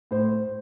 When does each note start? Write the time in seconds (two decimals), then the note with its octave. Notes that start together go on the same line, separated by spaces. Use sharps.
0.11 A2 C5